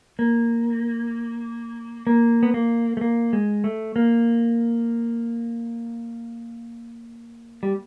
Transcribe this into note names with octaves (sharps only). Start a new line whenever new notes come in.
A#3
A#3
B3
A#3
A3
A#3
G#3
A3
A#3
G3